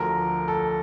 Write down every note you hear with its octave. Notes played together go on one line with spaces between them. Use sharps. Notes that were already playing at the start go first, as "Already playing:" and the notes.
Already playing: D2 D3 F3 A#4
A4